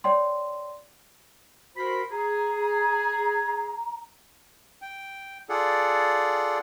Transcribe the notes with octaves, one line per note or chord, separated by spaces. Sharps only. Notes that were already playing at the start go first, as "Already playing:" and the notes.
C#5 D5 G5 C6
F#4 A#4 C5 B5
G#4 A#5
G5
F4 G#4 A4 D5 F#5